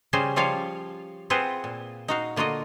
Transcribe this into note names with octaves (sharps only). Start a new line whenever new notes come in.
C#3 G3 C#4 G#4 C5
F3 G3 F4 C#5 F5
C4 F4 G#4 B4 C5 F#5
A#2
D#4 F#4 F5
D3 A#3 F4 F#4 D#5